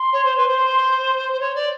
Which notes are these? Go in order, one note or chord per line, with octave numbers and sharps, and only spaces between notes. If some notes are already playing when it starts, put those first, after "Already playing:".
Already playing: C6
C#5
C5
B4
C5
C5
C#5
D5